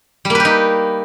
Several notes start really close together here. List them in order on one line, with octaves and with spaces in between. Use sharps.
G3 A#3 B4 G4 D#4